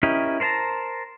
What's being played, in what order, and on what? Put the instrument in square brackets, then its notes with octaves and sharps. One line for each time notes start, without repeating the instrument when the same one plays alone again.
[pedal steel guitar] C#4 E4 G4 A#4 D#5
A#4 C5 D5 A5 A#5